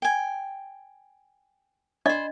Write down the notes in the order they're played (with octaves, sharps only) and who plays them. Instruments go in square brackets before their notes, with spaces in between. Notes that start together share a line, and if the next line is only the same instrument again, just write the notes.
[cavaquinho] G5 G#5
[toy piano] D4 D5 D#5 [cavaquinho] C5 B5